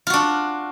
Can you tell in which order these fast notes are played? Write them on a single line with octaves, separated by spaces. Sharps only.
F4 F#4 D4